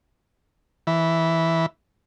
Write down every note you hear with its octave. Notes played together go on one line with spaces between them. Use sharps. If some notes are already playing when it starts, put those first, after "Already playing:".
E3